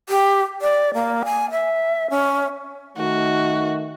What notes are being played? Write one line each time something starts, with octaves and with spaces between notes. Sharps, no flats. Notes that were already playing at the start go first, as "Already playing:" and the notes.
G4
D5
A#3
G#5
E5
C#4
D#3 A3 D#4 F#4